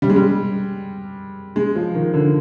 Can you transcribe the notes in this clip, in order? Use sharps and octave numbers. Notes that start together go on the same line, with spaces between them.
G3
G#3
G3
G#3
F3
D#3
D3